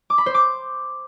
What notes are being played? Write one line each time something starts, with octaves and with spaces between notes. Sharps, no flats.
D6
B5
C5
D6